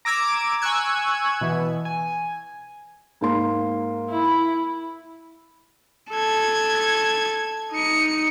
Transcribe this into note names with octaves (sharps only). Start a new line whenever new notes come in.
A#5 D6 E6 G#6 D7
G#5 C#6 E6 F#6 G#6
B2 E3 B3
G#5
G#2 A#3 C6
E4
A4 G#6
D#4 C#7